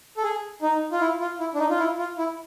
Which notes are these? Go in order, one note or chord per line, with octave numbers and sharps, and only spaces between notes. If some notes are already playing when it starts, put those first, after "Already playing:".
A4
G#4
D#4
F4
E4
F4
E4
D4
D#4
F4
E4
F4
E4